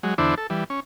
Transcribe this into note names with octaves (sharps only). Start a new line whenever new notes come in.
F#3 G#3
E2 D3 D4 E4 C5
A4
E3 G3
C#4